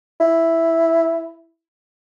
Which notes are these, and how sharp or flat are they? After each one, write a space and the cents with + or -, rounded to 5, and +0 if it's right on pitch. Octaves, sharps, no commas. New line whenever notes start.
E4 +0